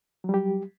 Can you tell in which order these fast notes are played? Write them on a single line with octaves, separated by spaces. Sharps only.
F#3 G3 G4